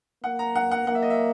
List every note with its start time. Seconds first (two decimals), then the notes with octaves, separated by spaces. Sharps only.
0.23 A#3 F#5
0.39 A#5
0.55 F#5
0.71 F#5
0.87 A#3 F#5
0.95 E5
1.02 D#5
1.10 E5